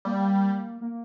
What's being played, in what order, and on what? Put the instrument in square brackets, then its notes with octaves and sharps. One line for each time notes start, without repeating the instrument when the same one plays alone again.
[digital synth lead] G3 [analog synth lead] A#3
[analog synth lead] A#3